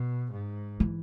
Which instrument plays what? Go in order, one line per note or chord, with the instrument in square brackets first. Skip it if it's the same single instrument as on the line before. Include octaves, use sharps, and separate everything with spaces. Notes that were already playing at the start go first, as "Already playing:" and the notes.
Already playing: [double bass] B2
G#2
[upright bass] E3